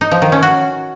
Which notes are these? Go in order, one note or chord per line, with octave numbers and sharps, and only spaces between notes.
D#4
F3
D#3
C#4
F#4